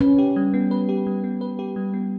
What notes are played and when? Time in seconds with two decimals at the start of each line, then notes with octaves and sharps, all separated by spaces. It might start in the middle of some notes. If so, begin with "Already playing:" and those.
0.01 C#4 B4
0.19 G4
0.36 G3
0.54 B3
0.71 B4
0.89 G4
1.07 G3
1.24 B3
1.41 B4
1.59 G4
1.76 G3
1.94 B3